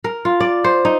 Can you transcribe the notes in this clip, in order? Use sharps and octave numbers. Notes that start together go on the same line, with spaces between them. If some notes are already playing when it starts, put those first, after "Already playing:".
A#4
F4
D5
C5
D#4